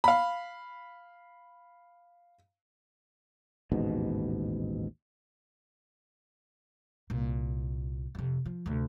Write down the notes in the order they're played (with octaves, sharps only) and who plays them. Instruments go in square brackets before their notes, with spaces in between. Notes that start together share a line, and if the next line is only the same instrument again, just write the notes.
[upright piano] F5 B5
[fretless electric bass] A1 D#2 G#2 B2
[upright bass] C2 A#2
F2 C3
F3
D2 C3